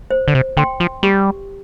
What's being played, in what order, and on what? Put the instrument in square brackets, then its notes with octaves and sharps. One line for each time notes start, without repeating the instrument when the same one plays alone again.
[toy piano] C5
[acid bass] D3
C3
[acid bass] D3 [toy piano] G5 C6
[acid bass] F3
[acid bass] G3 [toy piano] G4